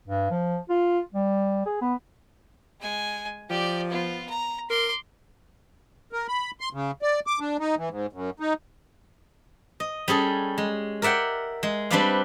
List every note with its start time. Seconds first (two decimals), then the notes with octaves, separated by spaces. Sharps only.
0.07 G2
0.31 F3
0.69 F4
1.14 G3
1.66 G#4
1.82 B3
2.81 G#3 G#5
3.50 F3 G4 D5
3.90 B3 F4
4.29 A#5
4.70 A#4 C6 D6
6.13 A#4
6.28 B5
6.60 C6
6.73 C#3
7.02 D5
7.27 D6
7.40 D4
7.59 D#4
7.78 E3
7.89 G#2
8.13 F#2
8.40 D#4
9.80 D#5
10.08 G3 C#4 G#4 A4
10.58 G#3
11.02 A#4 D5 E5 F#5 G5
11.63 G#3
11.90 G3 C4 D4 B4 D5 F5